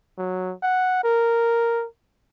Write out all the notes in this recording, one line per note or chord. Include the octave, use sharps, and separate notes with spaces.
F#3
F#5
A#4